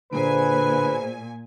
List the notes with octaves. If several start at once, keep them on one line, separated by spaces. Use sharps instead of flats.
A#2 D3 A#3 G#4 B4 C5 G#5